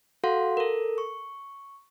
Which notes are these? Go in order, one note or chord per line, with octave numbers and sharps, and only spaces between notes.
F#4 A4 F5 F#5 C6
A4 A#4
C#6